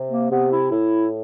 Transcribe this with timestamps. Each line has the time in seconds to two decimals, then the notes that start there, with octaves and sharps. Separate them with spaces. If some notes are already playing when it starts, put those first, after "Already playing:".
Already playing: C3
0.10 A#3
0.30 C3 B3
0.51 E4
0.70 A2 E4